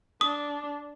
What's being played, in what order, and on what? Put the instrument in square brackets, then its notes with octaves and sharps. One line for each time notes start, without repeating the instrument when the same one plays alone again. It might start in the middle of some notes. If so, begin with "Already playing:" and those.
[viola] D4 [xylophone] D#6